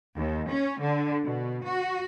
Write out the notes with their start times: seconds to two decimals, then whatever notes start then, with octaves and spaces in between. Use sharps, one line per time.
0.16 D#2
0.48 C#4
0.81 D3
1.24 B2
1.66 F#4